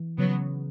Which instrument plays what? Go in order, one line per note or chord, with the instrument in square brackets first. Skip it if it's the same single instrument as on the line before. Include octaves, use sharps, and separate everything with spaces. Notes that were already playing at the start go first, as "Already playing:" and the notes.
Already playing: [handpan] E3
[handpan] C#3 [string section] F#3 B3